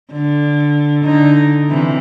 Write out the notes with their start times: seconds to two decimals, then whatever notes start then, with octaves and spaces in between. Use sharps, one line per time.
0.12 D3
1.04 D3 D#4
1.69 C3 E3